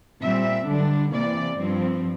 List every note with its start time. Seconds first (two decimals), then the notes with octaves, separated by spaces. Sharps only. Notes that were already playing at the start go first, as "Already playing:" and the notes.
0.22 A#2 G3 C4 E5
0.68 D3 G3 D4
1.13 C3 E3 A#3 D5
1.58 G2 F3 C4